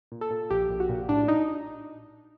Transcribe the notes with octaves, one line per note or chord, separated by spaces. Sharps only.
A#2
A4
A#2
A#1 G4
A#1
F#4
A#2
A2 D4
D#4